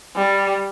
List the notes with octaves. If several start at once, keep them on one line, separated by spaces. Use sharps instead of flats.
G3